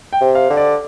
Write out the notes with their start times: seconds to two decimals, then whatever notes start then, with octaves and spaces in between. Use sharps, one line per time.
0.13 G5
0.21 C3
0.35 F5
0.50 D3
0.57 D5